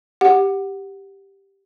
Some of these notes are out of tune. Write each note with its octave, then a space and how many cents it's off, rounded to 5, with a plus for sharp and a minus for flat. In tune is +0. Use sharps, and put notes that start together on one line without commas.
G4 +0 F#5 +0